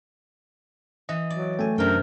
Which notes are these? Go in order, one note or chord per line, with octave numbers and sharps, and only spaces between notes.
E3 D#5
F#3 D5
A3 G5 G#5
F#2 C3 D4 A#4 G5